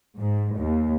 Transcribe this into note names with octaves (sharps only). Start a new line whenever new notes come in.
G#2
D#2